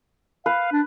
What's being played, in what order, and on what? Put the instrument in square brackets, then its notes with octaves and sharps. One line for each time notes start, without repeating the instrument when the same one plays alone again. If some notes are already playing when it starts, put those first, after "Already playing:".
[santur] B4 [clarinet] F5
[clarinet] D4